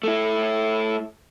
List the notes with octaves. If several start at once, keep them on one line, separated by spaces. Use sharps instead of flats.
A3 E4